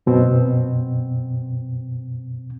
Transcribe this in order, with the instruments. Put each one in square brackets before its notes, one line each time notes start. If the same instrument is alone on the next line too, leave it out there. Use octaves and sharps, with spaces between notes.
[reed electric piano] F#2 B2 C4